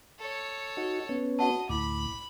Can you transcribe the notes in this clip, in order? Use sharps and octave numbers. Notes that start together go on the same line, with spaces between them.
A4 C#5
D#4 F#4
B3 C#4
F#4 D#5 F#5 A5
D2 A2 E4 B5 D6